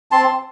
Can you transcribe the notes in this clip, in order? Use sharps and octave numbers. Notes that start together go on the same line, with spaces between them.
C4 A5 C6